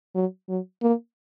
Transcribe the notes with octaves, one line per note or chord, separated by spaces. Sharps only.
F#3
F#3
A#3